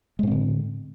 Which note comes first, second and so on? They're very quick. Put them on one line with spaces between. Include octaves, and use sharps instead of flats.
G#3 A2 C4 D3